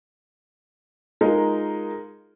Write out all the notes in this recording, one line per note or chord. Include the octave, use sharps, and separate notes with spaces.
G#3 D#4 F4 A#4